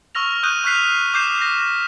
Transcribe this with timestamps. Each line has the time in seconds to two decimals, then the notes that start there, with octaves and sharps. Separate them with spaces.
0.15 C#6 E6 F6 A#6 F7
0.43 C#6 D#6 F#6 G6 D#7
0.64 C#6 F6 F#6 B6 C7 F7
1.14 D6 G6 C7 E7
1.41 A#6